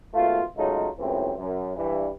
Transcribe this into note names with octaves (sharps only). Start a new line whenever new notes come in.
G#1 B2 A3 F4
C#3 F#3 G#3 A3 D#4 F4
C#2 F#2 A2 E3 C4
F#2
G2 E3 G3